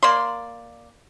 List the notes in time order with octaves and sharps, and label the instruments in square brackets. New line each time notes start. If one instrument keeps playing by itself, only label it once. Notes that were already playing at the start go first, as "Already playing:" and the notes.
[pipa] A#3 D5 C6